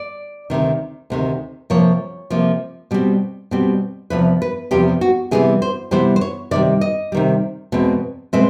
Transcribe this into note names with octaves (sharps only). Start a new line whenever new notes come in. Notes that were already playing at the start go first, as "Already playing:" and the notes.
Already playing: D5
D2 C3 D#3
D2 C3 D#3
C3 F3 A#3 C#5
C3 F3 A#3
B2 G3 C4
B2 G3 C4
E2 C3 F3 B4
B4
E2 C3 F3 G4
F#4
C3 E3 G3 B3 G#4
C5
C3 E3 G3 B3 C5
C5
C#5
C3 D#3 G3 D5
D#5
C3 D#3 G3
E2 B2 G#3 C4
B2 G#3 C4 E5